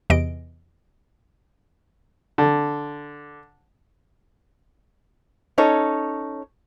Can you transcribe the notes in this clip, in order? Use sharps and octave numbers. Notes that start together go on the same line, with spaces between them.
E2 C3 E3 D#5 D7
D3
C#4 D#4 A4 C#5